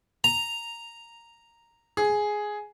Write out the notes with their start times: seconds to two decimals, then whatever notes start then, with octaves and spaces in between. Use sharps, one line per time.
0.24 A#5
1.97 G#4